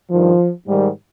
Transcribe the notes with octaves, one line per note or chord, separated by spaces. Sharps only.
G2 D#3 F3
G#2 D#3 G3